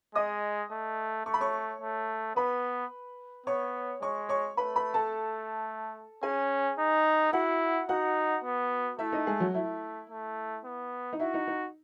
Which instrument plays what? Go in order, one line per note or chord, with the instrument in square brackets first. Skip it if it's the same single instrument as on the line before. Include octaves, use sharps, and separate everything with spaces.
[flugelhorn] G#3 [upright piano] D#5 D#6
[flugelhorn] A3
[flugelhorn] A3 [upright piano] C#6
[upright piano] B5
C#5 C#6
[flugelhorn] A3
[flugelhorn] B3 [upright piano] B4 B5
[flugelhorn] B3 [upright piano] C#5 C#6
[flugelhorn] G#3 [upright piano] C#5 C#6
[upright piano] C#5 C#6
[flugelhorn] A3 [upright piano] B4 B5
[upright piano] B4 B5
A4 A5
[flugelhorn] C#4 [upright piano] G#4 G#5
[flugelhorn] D#4
[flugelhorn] E4 [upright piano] F#4 F#5
[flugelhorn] D#4 [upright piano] F#4 F#5
[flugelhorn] B3
[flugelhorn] A3 [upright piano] E4 E5
[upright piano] D#4 D#5
G#3 G#4
F#3 F#4
[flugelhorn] A3 [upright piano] E4
[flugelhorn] A3
B3
[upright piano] D#4
[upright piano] E4 [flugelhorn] F#4
[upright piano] D#4
D#4